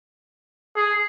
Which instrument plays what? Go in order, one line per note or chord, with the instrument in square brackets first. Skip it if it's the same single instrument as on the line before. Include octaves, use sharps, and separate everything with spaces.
[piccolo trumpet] G#4